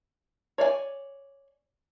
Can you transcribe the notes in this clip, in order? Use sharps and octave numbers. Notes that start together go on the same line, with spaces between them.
C#5 D5 F5 G#5